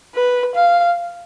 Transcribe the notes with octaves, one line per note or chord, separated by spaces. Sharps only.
B4
F5